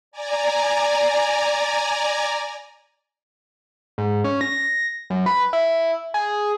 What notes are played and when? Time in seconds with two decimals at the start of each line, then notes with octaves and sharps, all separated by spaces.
0.12 D5 G#5 A#5
3.98 G#2
4.24 C#4
4.41 A#6
5.10 F#2
5.26 B4
5.53 E4
6.14 G#4